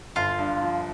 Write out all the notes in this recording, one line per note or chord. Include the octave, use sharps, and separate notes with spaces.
G1 F4
G2
F3